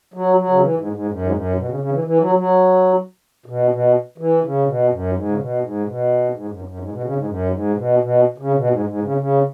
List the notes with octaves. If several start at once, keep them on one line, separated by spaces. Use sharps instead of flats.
F#3
F#3
C#3
E3
G#2
G#2
F#2
G#2
F#2
B2
C#3
C#3
E3
E3
F#3
F#3
B2
B2
E3
C#3
B2
F#2
G#2
C#3
B2
G#2
B2
G#2
F#2
F#2
G#2
B2
C#3
G#2
F#2
G#2
B2
B2
C#3
B2
G#2
G#2
C#3
C#3